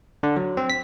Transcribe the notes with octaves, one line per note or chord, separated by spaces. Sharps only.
D3
F#3
C4
B6